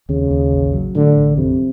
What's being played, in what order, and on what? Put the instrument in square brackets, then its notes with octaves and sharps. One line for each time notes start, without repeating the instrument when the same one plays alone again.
[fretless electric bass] D#2 [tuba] C#3
[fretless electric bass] D#2
A1
F#3
[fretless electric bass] A2 [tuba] D3
[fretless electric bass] A1
[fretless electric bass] F2 [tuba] C3